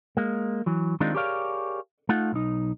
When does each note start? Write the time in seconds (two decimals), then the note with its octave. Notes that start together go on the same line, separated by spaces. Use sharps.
0.17 G#3 A#3
0.66 E3 F#3
1.00 D#3 G#3 C4 D4 D#4 F4
1.15 G4 G#4 A#4 C#5 D5 F5
2.09 A3 D#4 F4 F#5
2.33 B1 D#4